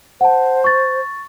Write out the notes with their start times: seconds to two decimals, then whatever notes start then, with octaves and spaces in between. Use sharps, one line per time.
0.21 C5 F#5 A5
0.64 C#6 A6